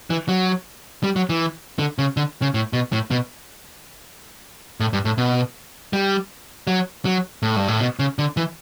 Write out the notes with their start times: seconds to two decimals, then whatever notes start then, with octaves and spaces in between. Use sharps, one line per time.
0.10 E3
0.28 F#3
1.04 G3
1.16 F#3
1.29 E3
1.79 D3
1.98 C#3
2.17 D3
2.42 C#3
2.54 A2
2.73 B2
2.92 A2
3.11 B2
4.80 A2
4.93 G2
5.05 A2
5.18 B2
5.93 G3
6.67 F#3
7.05 F#3
7.43 A2
7.56 G2
7.68 A2
7.80 B2
7.99 C#3
8.19 D3
8.37 E3